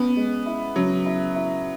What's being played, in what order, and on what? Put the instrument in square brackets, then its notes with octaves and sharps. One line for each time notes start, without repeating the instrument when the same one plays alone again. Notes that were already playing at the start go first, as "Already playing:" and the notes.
Already playing: [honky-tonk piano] B3 [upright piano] C#4
[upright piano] G#3
E4
[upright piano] C#3 [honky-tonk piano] F#3
[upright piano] E4
E4